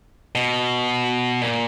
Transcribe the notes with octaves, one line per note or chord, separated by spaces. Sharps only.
B2
A#2